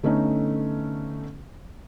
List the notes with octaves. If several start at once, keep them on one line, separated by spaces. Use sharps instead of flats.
D3 A3 B3 C#4 D#4